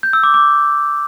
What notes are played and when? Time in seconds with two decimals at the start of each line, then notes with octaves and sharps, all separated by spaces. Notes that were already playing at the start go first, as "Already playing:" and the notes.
0.03 G6
0.13 E6
0.23 D6
0.34 D6